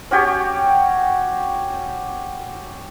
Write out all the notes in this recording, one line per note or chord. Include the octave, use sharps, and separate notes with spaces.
C#4 F#4 G4 C#5